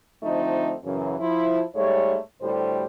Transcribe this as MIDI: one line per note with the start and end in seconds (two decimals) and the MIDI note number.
0.22 0.73 50
0.22 0.73 53
0.22 0.73 57
0.22 0.73 60
0.22 0.73 63
0.83 1.15 42
0.83 1.15 49
0.83 1.15 52
1.20 1.60 53
1.20 1.60 64
1.75 2.17 44
1.75 2.17 55
1.75 2.17 57
1.75 2.17 73
2.41 2.85 38
2.41 2.85 45
2.41 2.85 55
2.41 2.85 67
2.41 2.85 72